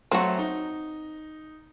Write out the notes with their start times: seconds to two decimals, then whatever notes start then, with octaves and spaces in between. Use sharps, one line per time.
0.11 F#3 A3 C4 F#4
0.39 D#4